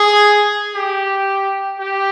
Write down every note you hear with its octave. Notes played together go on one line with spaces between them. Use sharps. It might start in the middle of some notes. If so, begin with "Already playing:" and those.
Already playing: G#4
G4
G4